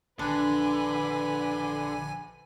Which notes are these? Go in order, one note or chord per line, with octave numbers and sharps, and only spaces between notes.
A#1 D3 D4 B4 G#5 B5